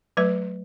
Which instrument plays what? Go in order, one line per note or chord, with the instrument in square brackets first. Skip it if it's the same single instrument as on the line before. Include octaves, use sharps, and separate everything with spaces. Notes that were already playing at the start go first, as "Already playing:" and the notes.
[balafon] F#3 A3 B4